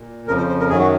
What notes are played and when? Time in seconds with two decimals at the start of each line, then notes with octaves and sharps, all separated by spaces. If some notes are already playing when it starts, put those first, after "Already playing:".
Already playing: A#2
0.27 F2 C#3 F3 A#4
0.38 C5
0.48 C5
0.60 A#4
0.69 F#2 D#3 F#3 G#4
0.79 F#4